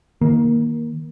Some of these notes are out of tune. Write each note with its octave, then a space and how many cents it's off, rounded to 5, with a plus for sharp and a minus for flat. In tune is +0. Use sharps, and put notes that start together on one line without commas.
D#3 +20 A#3 +10